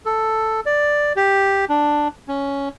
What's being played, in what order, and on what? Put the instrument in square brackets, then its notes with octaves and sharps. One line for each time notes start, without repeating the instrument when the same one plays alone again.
[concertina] A4
D5
G4
D4
C#4